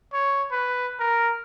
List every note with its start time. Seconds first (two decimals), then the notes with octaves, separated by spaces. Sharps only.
0.13 C#5
0.51 B4
0.99 A#4